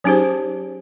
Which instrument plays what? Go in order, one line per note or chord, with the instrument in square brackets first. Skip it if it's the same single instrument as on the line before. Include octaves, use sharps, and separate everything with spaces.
[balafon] F#3 C#4 D#4 G4 G#4 C5